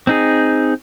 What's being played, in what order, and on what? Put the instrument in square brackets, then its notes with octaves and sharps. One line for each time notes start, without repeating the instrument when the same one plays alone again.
[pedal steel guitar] C4 D#4 G#4